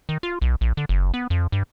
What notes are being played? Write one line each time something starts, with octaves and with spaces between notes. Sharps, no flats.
D#3
F4
B1
A#1
D3
F#1
B3
F2
G2